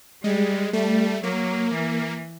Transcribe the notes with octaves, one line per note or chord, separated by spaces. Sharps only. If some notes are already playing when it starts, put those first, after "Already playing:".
G3 G#3
G3 A3
F#3 A#3
E3